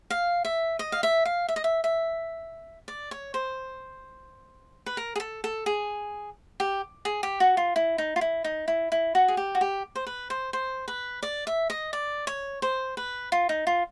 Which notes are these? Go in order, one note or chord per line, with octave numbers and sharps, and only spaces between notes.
F5
E5
D#5
F5
E5
F5
E5
D#5
E5
E5
D5
C#5
C5
B4
A#4
G#4
A4
A4
G#4
G4
G#4
G4
F#4
F4
E4
D#4
F4
E4
D#4
E4
E4
F#4
G#4
G4
F#4
G4
C5
B4
C5
C5
B4
D5
E5
D#5
D5
C#5
C5
B4
F4
D#4
F4